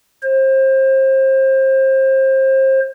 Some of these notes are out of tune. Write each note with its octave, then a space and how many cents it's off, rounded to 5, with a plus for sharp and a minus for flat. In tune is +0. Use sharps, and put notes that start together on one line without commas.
C5 +30